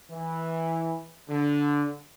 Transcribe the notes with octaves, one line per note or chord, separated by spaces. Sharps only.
E3
D3